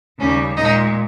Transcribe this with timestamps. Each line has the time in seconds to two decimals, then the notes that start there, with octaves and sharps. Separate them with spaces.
0.18 D#2 C#3 G3 C#4
0.56 A#2 G#3 D#4